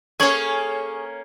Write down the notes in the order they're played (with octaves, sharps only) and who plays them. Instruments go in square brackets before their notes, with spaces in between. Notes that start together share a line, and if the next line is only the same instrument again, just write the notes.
[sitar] A#3 C#4 [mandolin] G#4 C#5 [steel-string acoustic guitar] A4 [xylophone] C#6 G#6 F#7